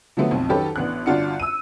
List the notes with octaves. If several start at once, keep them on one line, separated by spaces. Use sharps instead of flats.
D3 F3 F#3 A3 B3
B1 F2
D#3 F#3 C#4 G4 A4 B4
A1 B3 D4 F#6
G1 D4 F4 F#4 C#7
E6 D#7